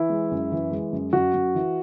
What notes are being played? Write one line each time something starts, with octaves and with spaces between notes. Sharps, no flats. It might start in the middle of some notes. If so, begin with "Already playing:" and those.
Already playing: E3 E4
G#3
F#2
E3
G#3
F#2
F#2 F#4
F#2
E3